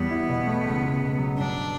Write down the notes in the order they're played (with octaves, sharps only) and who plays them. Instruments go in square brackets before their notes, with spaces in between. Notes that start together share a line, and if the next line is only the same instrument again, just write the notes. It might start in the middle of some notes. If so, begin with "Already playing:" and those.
Already playing: [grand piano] E2 G3 [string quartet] B3
[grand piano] E4
B2
A3
C#2
C#2
B2
F#3
[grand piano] G2 [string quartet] D4